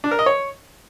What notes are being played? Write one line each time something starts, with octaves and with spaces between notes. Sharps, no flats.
D4
A#4
D#5
C#5